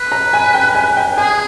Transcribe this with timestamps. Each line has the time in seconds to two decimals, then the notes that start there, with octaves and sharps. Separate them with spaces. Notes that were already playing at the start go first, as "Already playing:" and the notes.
Already playing: B4
0.12 A#5
0.33 G#5
0.54 G5
0.75 G#5
0.97 G5
1.18 G#4 G#5